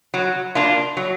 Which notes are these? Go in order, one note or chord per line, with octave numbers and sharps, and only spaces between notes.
F#3
A#3 D4 F4
F#3